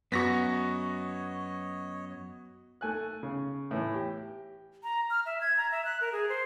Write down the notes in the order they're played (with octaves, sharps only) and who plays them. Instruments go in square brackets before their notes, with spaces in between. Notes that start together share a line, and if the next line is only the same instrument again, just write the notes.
[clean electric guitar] F#2 [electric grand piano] B3 F#4 [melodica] C#5 D#5 [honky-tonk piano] C#6 A#6 B6
[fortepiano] A3 G#5 F#6
C#3
A2 E3
G4
[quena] A#5
F6
E5
G#6
A#5
E5
F#6
A#4
G#4
C5